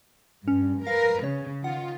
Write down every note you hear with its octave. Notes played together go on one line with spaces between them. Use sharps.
G2 C#4
A#4 B4 F5
C#3 C#5
D#3 F4 F#5